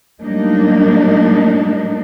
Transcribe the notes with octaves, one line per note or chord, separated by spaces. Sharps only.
A2 F#3 G3 A#3 D4 D#4